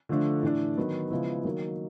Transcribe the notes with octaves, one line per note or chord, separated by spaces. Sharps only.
D3 F3 A3 D4
A2 E3 A3 D4
D#3 F#3 B3
C#3 F3 G#3 B3 E4
D#3 F#3 A#3 D#4